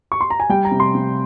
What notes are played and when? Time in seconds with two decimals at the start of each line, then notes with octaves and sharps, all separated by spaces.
0.12 C#6
0.21 C6
0.30 A#5
0.40 G#5
0.49 G3 G5
0.65 A#5
0.72 C3
0.80 C6
0.95 C3